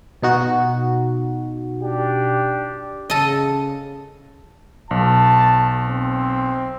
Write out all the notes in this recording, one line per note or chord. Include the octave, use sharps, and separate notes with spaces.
B2 D#4 F#4
D4 G4
C#3 A4 D#5
B1 A5
C4